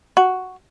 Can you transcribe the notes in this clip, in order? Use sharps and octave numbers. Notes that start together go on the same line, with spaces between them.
F#4